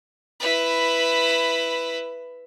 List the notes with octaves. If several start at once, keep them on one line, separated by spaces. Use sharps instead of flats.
E4 B4